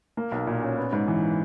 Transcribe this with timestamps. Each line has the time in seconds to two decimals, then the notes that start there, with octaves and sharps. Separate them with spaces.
0.17 A#3
0.32 B1
0.47 A#2
0.62 C#4
0.77 B3
0.93 G#2
1.08 E3